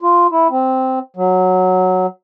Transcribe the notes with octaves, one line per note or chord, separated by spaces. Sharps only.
F4
E4
C4
F#3